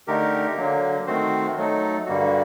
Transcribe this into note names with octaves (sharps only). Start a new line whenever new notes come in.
D3 A3 D#4 G4 A#4
D3 F#3 A#3
D#3 A3 C4 F#4 C5
F#3 A3 D#4 A4
G2 D3 G3 A#3 F#4